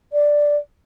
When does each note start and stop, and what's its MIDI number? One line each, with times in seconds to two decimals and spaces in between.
0.12 0.56 74